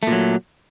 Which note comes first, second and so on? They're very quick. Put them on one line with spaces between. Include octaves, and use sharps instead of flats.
A3 A#2 F#3